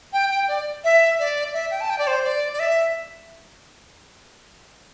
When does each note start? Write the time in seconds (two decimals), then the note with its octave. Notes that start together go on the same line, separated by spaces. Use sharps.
0.13 G5
0.31 G5
0.48 D5
0.84 E5
1.19 D5
1.54 E5
1.71 G5
1.81 A5
1.90 G5
1.99 D5
2.07 C5
2.24 D5
2.54 D5
2.59 E5